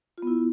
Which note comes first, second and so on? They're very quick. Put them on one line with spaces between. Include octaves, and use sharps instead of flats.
F4 B3 E4